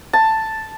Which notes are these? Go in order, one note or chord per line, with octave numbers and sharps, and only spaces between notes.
A5